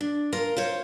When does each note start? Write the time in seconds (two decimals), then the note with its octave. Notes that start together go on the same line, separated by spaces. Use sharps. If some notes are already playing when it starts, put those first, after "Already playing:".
0.01 D4
0.33 F4 A#4
0.56 F4 C5 C#5